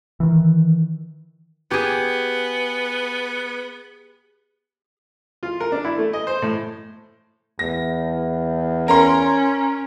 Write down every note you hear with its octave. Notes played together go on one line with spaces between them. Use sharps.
D#3 E3
B3 G4 G#4
F4
A#4
D4
E4
A3
D#5
C5
A2
E2 A#6
C#4 A#4 A#5 C6